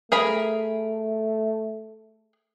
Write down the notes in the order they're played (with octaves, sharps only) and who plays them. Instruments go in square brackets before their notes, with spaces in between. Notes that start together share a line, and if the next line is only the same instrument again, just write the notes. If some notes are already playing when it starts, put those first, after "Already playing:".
[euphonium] A3 [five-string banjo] G#4 A#4 B5